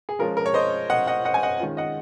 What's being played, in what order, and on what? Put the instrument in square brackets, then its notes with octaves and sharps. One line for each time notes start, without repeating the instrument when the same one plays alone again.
[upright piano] G#4
F3 G#3 C#4 F4 A#4
A#4
C#5
C5 D#5
D#5 F#5
D#5 F#5
D#5 F#5
G#5
D#5 F#5
D#3 G#3 C#4 F4
D#5 F#5